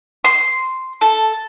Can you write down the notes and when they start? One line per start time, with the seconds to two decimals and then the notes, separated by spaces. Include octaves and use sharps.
0.25 C6
1.01 A4